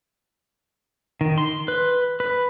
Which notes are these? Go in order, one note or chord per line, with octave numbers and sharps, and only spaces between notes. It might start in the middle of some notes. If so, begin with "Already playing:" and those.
D#3
C6
B4
B4